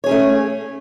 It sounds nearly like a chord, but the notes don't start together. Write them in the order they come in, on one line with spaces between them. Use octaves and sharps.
C#5 G#4 C#4 A3